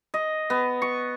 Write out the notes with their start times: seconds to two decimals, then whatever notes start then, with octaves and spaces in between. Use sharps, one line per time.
0.14 D#5
0.50 B3
0.82 C#6